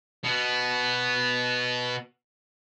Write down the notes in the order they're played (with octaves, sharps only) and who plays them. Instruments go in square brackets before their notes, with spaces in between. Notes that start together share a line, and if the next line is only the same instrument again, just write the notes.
[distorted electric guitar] B2 B3